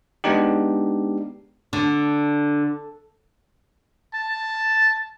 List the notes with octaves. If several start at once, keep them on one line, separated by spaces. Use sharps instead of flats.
G#3 B3 D4 D#4 G4
D3
A5